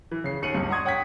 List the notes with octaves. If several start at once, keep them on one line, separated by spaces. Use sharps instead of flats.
E3
C#3 C7
D#2 C#7 D#7 F#7
C#2 G2
F#5 A#5 C6 C#6 D#6 G#6
C#5 F#5 G5 D#6 G#6 B6